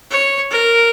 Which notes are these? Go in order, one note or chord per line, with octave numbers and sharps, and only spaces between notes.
C#5
A#4